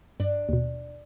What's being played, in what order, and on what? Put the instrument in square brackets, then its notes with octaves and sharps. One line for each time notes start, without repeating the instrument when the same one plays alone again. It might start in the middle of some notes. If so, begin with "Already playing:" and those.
[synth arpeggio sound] G2 [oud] D4
[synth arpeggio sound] D#2 B2